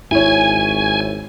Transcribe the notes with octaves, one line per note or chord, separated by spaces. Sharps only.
G#1 E4 C#5 G#5